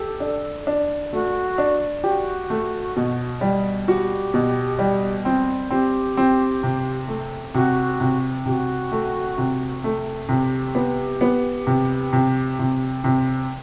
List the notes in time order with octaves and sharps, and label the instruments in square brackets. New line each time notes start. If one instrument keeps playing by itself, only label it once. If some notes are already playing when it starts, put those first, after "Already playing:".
Already playing: [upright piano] G4 [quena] A4
[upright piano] D4
D4
[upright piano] A3 [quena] F#4
[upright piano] D4
[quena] F#4 [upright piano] G4
[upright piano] A3
B2
G3
[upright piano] F#4 [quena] G4
[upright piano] B2
G3
C4
[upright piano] C4 [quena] G4
[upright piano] C4
C3
A3
[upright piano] C3 [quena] F#4
[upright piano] C3
[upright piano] C3 [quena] G4
[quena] F#4
[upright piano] A3
C3
A3
[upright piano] C3 [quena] G4
[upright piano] B3
B3
C3
C3
C3
C3